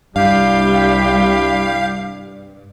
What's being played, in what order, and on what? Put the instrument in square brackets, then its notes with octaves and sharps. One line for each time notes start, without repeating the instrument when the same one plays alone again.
[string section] C2 G3 [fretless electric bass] G2 [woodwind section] D4 E4 G4 [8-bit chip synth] F5